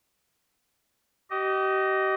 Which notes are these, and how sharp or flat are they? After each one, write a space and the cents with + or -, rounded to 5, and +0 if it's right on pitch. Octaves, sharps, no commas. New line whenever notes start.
G4 -35 D#5 +0